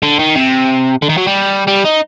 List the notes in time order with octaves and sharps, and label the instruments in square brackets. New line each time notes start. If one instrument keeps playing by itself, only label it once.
[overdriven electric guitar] D3
D#3
C3
D3
D#3
F#3
G3
G3
D#4